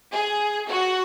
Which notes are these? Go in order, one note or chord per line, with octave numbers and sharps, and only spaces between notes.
G#4
F#4